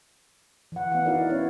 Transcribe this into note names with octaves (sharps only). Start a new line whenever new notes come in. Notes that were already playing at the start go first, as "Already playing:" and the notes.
E3 F#5
B3 F5 F#5
D#4 E4 F#4 A#4 D5 F5
B3 C#4 E4 C#5